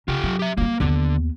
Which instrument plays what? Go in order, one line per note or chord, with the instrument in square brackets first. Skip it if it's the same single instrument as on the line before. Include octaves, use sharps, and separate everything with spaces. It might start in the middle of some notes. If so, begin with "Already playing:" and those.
[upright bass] C#3 [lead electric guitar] F4 G4
[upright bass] F#3
[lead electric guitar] G4 E5
[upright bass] F#3 G3 [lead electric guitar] A#3
[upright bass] D#2 B3 [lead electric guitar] D3